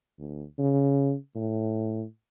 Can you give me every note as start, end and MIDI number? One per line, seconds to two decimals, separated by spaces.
0.19 0.44 38
0.58 1.15 49
1.35 2.04 45